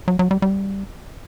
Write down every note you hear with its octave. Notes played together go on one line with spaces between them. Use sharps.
F#3
F#3
G3
G3